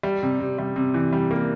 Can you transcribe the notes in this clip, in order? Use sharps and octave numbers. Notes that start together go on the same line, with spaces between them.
G3
C3
C3
G3
C3
E3
G3
A#3